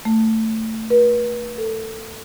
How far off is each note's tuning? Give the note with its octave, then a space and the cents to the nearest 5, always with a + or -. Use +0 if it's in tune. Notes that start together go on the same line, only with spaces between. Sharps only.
A3 +15
B4 -40
A4 +15